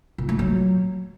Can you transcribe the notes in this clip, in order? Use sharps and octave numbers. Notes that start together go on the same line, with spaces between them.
A#2
A3
F#3